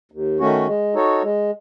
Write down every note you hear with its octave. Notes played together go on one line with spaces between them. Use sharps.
D#2
D#3 A3 C#4 F#4
G#3
D#4 F#4 A4 C#5
G#3